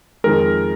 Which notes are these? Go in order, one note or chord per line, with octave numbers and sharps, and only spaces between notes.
F2 D#3 G#3 A#4